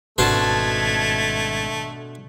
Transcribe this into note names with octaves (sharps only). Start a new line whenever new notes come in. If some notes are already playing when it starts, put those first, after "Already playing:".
G#1 B2 A3 D4 C5 A5 G#6